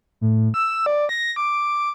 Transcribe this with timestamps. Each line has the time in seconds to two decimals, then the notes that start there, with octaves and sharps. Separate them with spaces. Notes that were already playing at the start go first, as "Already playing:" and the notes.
0.21 A2
0.54 E6
0.86 D5
1.09 A#6
1.36 D6